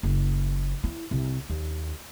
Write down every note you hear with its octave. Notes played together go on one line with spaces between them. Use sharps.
F#1
E4
C2
D#2